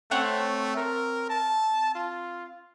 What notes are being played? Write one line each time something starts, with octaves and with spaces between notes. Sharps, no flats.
A3 C4 C#5 F#5
A#4
A5
F4